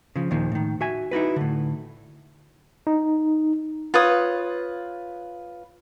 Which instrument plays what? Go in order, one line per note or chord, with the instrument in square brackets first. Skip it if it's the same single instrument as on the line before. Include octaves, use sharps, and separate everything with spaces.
[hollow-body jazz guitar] C#3 F3
D#2 A#2 D#3 F3
A2 D#3
F#4 E5 G#5
D#4 E4 F#4 B4
A2 D3
[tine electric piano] D#4
[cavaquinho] F4 B4 C#5 D#6